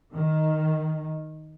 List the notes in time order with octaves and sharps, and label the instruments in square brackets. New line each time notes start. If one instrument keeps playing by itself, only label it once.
[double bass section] D#3